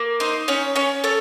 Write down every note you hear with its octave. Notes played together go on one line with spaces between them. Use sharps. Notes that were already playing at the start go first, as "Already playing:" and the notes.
Already playing: A#3
D#4 C5
C#4 C#5
C#4 C#5
A4 C#5